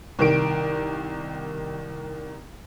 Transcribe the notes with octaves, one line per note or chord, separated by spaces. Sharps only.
C2 D#3 D7